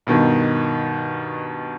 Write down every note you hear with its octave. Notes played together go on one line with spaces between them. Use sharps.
G2 B2 D#3